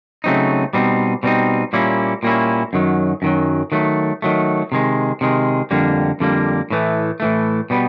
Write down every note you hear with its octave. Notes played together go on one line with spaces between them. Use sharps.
C#3 F#3 A3 C4 D#4
B2 G3 C4 D#4
B2 G3 C4 D#4
A#2 G3 A#3 C#4 E4
A#2 G3 A#3 C#4 E4
F#2 D#3 F#3
F#2 D#3 F#3
D#3 F#3 A3
D#3 F#3 A3
C3 D#3 G#3
C3 D#3 G#3
F2 D3 G3 A#3
F2 D3 G3 A#3
A2 E3 A3
A2 E3 A3
B2 G3 B3